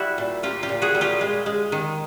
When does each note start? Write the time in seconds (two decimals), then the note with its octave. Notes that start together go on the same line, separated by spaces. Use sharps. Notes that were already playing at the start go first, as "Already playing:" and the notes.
Already playing: G3 E4 F#4
0.18 A#2
0.43 A#3 F4 G4
0.63 F4 G4
0.69 A#2
0.82 F#4 G#4
0.95 G3
1.01 F4 G4
1.21 G#3
1.46 G#3
1.72 D#3